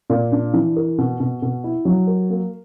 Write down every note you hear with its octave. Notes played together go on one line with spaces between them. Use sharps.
A#2
D4
E3
A#4
B2
B2
B2
E4
F#3
A#4
A#3